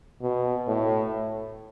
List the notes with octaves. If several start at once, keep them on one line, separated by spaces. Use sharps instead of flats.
B2
A2